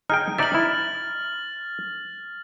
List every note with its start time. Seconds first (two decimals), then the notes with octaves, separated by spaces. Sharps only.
0.10 D#4 G#4 G5 F6
0.38 D#4 D5 E5 A6 F#7
0.54 E4